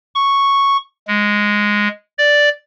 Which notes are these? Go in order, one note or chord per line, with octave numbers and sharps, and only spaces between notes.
C#6
G#3
D5